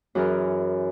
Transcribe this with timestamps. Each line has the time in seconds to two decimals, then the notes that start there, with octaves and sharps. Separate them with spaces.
0.15 F#2 E3 G#4 A#4